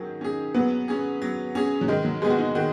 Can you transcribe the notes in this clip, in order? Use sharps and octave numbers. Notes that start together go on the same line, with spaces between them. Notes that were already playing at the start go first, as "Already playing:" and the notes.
Already playing: D#3 F#3 C#4 G#4
C#4 G#4
F#3 B3
C#4 G#4
F#3
C#4 G#4
F#3
D#3 G#3
F#3
G#3 B3 G#4
F#4
D#4
D#3 F#4